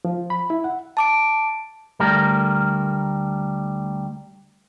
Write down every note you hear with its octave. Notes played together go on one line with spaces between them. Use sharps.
F3
B5
E4
F#5
A5 D6 D7
D2 G3 A3 A#4